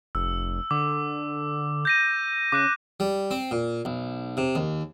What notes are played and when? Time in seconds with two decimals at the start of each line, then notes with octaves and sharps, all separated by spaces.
0.15 F1 E6
0.71 D3 D6
1.85 G6 A#6 D#7
2.52 C#3 D6 F#6 D#7
3.00 G3
3.31 C4
3.51 A#2
3.85 B1
4.37 C3
4.55 D#2